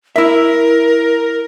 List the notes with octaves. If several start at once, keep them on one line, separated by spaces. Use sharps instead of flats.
E4 A#4 E5